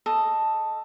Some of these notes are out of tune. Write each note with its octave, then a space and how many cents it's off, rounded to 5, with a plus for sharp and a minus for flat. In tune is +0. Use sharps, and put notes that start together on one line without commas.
A4 +0 D#5 +0